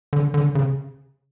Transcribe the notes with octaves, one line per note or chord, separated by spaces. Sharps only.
D3
D3
C#3